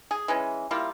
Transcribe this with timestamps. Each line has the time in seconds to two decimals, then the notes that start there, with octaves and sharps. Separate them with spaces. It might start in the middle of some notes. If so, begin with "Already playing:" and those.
0.11 G#4
0.28 E3 G#3 C#4
0.71 G3 A#3 E4 F4